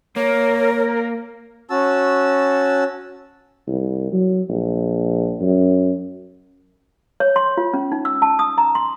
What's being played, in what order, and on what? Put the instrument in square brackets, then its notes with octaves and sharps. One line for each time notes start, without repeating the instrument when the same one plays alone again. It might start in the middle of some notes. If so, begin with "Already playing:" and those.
[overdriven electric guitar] A#3 [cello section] A#4 [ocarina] C#5
[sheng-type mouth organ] C#4 F#4 A5 E6
[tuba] C2
F#3
A#1
F#2
[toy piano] C#5
C6
F4
C#4
D#4
E6
A5
D#6
A#5
C6